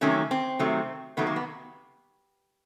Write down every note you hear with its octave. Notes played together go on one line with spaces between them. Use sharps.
C3 D#3 F#3 A3 C#4
C4
C3 D#3 F#3 A3
C3 D#3 F#3 A3 B3
A#3
B3